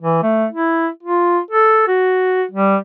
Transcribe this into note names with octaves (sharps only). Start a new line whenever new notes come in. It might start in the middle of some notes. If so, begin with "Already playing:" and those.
E3
A3
E4
F4
A4
F#4
G3